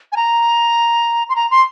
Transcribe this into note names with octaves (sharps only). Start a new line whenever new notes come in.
G#5
A#5
C6
A#5
C6